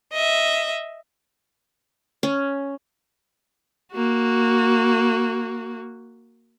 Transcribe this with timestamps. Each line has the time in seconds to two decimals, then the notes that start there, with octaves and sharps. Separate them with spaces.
0.13 D#5 E5
2.23 C#4
3.93 A#3 F#4